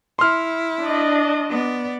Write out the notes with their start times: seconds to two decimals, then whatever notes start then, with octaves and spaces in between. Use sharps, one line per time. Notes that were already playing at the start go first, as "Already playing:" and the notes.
0.19 E4 C6 F6
0.80 D4 D#5
1.50 B3 D5